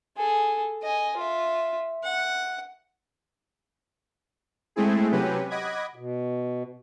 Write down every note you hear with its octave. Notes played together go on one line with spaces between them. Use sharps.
G#4 A4
D#5 G#5
F4 E5
F#5
G#3 A3 C4 E4 G#4
C3 F#3 C#4 G4 B4
D#5 F#5 B5 D6 G#6
B2